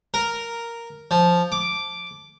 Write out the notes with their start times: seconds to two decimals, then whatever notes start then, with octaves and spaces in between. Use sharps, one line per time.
0.14 A#4
1.11 F3
1.52 D6